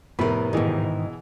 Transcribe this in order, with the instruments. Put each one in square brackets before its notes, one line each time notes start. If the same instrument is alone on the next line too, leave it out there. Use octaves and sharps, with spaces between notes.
[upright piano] F1 A2 [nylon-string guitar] B3 A#4 [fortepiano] B5
[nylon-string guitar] G#2 D#3 [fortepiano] B2 E3 G#4